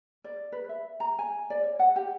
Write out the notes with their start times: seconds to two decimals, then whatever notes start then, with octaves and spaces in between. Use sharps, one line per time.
0.24 D5
0.52 B4
0.69 E5
1.00 A#5
1.19 G#5
1.50 D5
1.63 C#5
1.79 F#5
1.96 G4